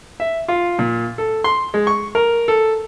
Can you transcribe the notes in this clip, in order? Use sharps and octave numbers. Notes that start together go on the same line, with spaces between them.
E5
F4
A#2
A4
C6
G#3
C#6
A#4
A4